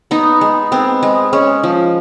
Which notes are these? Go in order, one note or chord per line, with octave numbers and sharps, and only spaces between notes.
B3 D#4
G#3
B3 C4
G#3
G#3 C#4
F3